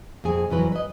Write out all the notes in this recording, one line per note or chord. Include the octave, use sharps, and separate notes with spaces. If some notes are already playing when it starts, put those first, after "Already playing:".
F2 A#2 C4 G#4 G#5
F2 E3 F#3 B4
B4 D#5